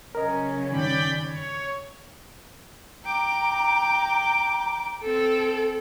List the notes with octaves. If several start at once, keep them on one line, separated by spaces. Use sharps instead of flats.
C#3 F#3 C#4 A#4 D#5
G2 D#3 D5 G5 B5
C#5
G5 A#5 D6
C4 A4